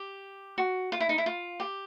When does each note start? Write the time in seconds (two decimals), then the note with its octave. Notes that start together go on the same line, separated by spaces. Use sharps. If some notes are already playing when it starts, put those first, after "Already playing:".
Already playing: G4
0.58 F#4
0.92 F4
1.00 E4
1.09 D#4
1.18 E4
1.26 F4
1.60 G4